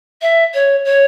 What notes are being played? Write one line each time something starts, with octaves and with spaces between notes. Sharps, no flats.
E5
C#5
C#5